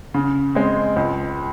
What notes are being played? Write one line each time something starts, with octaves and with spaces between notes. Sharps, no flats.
C#3
G#3 C4
C#2